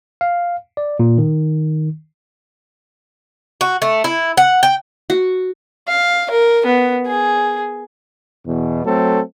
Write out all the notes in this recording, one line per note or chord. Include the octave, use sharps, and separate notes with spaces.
F5
D5
A#2
D#3
F#4
A3
E4
F#5
G5
F#4
F5
A#4
B3
G#4
E2 B2
F#3 A3 C4 A4